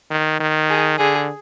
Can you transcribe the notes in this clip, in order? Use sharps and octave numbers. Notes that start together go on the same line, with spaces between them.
D#3
D#3
G#4
D3 G#4